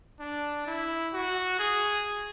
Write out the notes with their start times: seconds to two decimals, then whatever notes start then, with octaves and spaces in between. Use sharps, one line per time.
0.20 D4
0.66 E4
1.13 F#4
1.59 G#4